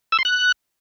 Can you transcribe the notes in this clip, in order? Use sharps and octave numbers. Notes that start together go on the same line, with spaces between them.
E6
C6
F#6